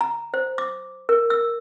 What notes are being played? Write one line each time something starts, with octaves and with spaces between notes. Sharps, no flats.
A#5
C5
D6
A#4
E6